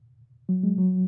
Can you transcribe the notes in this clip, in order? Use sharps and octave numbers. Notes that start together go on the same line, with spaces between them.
F#3
G#3
F#3